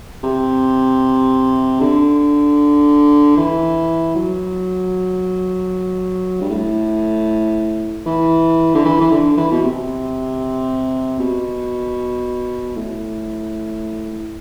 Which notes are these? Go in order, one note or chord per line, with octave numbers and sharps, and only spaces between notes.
C3
D3
E3
F#3
G2
A2
E3
D3
E3
E3
D3
E3
B2
C3
B2
A2